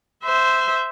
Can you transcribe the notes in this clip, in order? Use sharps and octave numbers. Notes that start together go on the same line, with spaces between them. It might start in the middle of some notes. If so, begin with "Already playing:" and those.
C5 E5